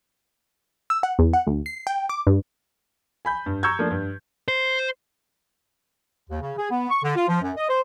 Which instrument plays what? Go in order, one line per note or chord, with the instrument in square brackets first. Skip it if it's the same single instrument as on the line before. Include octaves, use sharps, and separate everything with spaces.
[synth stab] E6
F#5
E2
F#5
D2
C7
G5
D6
G2
[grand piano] G#5 B5 G6
G2
A#5 C#6 E6 G6 G#6
F3 A3 A#3 D4
G2
[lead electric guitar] C5
[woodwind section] D#2
C#3
G#4
B3
C#6
D3
F4
F3
F#2
D#5
C5